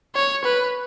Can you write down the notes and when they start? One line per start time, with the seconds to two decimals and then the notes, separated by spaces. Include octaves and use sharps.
0.15 C#5
0.44 B4